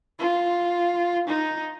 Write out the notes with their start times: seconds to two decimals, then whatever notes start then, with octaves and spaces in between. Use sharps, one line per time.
0.19 F4
1.28 D#4